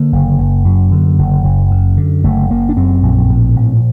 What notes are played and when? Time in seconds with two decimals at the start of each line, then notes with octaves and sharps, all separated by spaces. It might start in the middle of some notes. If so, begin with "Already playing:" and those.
Already playing: D3 A#3
0.12 F#1
0.39 F#1
0.65 F#2
0.91 D3
1.18 F#1
1.44 F#1
1.71 F#2
1.97 D3
2.24 F#1 A3
2.50 F#1 A#3
2.69 D4
2.76 F#2 C4
3.03 A#1
3.30 A2
3.56 A#1